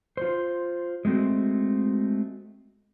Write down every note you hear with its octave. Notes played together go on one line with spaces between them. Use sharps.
F4 C5
G#3 A3 C4 F#4